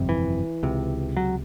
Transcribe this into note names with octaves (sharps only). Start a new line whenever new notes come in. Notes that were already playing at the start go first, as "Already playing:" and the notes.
Already playing: G1 F2 C3
E3
C#2 C3
F#3